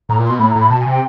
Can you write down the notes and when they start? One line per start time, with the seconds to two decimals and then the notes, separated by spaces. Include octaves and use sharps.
0.09 A2 A#5
0.19 A#2
0.25 C6
0.29 B2
0.39 A2 B5
0.50 A#5
0.56 A2 B5
0.70 B2 A5
0.80 G#5
0.86 C3 G5